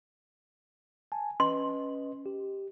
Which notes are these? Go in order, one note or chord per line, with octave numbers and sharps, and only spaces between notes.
G#5 A5
C#4 B4 D#5 C6
G4